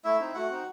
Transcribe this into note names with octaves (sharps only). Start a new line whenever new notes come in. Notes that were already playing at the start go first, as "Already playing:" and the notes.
A3 E4 E5
C4 D#4
A3 F#4 F#5
C4 D#4